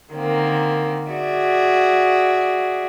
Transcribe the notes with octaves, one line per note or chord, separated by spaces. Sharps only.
D3 D#3 A#3 C4
F#4 G#4 D5 E5